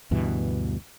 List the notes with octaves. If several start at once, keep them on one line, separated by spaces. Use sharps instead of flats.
D2 G2 B2 E3